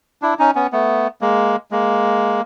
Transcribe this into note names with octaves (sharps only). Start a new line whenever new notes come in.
D4 E4
C#4 D#4
B3 C#4
A3 B3
G#3 A#3
G#3 A#3